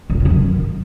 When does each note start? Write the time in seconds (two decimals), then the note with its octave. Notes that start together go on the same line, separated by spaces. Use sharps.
0.10 G2
0.15 C3
0.20 C#3
0.25 F2
0.30 F#2